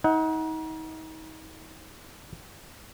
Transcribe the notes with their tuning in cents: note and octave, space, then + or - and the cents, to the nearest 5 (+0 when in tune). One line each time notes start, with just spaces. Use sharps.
D#4 +35 F#5 +0